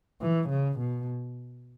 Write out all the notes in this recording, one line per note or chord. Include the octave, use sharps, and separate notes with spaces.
E3
C#3
B2